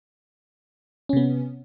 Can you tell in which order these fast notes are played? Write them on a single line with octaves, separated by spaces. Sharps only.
C#4 C3 B3